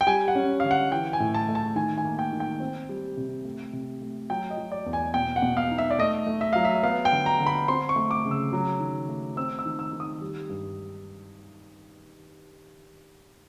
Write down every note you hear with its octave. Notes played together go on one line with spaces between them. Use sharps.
G5
G3 G#5
F#5
C#4
D3 F5
F#5
E3 G5
G#5
A2
A5
A3
A5
D#3 G#5
G#5
A#3
G5
D#3
G5
C4
G3
C3
A3
C3
A3
F#3 G5
D#5
F#3
D5
E2
G#5
B2 G5
F#5
B2
F5
D#4
E5
D5
A3 D#5
A3
E5
F#3 F5
E5
B3 F5
G5
D3
A#5
D3
B5
C4 C6
C#6
A3
D6
C#3
E6
F#3
D#3
A3
C4 E6
E6
D#3
E6
D#3
D#6
G3
G2